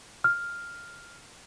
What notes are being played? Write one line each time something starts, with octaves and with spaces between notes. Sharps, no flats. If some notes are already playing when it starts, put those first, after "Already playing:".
F6